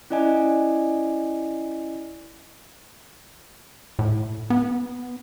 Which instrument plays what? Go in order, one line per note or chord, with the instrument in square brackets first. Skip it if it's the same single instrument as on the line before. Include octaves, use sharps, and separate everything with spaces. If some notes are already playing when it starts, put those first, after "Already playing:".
[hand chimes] C#4 E4 D5 D#5 G#5
[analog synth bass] A2
B3